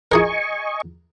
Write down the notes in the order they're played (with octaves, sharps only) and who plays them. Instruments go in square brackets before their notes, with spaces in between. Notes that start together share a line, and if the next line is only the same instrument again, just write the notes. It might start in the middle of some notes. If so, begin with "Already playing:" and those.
[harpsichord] E4 G#4 A#4 [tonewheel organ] D#5 G#5 C#6